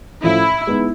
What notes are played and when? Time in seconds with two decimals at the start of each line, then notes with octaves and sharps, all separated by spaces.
0.23 A2 F3 A3 C#4 E4
0.67 G#3 B3 D#4